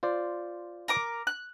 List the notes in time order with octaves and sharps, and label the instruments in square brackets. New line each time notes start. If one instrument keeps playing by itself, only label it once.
[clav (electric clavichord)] F4 C5 D5
[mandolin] A#4 A#5 D6
F#6